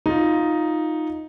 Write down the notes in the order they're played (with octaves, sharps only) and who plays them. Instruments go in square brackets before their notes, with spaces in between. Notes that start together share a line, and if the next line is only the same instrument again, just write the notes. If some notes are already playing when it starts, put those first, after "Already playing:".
[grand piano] D#4 F4